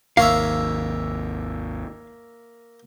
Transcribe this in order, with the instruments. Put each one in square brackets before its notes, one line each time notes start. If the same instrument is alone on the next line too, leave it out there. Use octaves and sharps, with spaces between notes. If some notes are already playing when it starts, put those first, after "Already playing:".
[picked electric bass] G#1 D#2 [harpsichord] A#3 C#5 E5 [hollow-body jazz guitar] F5